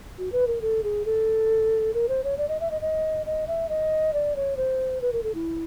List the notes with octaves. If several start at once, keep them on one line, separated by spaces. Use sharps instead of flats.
F#4
B4
A#4
A4
G#4
A4
A#4
C5
C#5
D5
D#5
E5
D#5
D#5
D#5
E5
D#5
D5
C#5
C5
B4
A#4
A4
E4